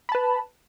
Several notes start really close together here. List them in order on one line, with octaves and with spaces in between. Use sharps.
B5 A5 B4